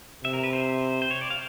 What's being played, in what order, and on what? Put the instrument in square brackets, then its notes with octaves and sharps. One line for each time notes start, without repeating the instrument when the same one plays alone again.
[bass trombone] C3 [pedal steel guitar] E5
[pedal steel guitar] A#4
B4
C5
C5
C#5
D5
F5